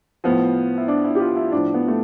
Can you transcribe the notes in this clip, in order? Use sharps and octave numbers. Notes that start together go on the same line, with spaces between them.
A2 F3 B3
E4
D4
E4
G4
F4
E4
A2 F3 D4
B3
A3